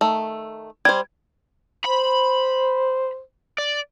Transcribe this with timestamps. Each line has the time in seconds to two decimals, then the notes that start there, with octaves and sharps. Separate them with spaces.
0.01 D#3 A3
0.85 G3 C5 G#6
1.85 C5 B5
3.58 D5